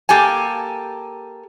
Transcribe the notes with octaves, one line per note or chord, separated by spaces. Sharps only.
A#3 G4 A4 G#5